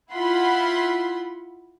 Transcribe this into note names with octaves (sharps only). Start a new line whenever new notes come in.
E4 F4 F#5 B5 C6